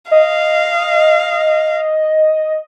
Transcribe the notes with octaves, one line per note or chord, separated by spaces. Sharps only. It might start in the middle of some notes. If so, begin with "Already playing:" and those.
D#5 F5